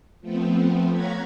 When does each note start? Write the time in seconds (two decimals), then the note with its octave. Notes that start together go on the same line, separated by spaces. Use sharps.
0.21 F3 A3 B3 C4
0.91 C#5 F5 F#5 A#5 G#6 B6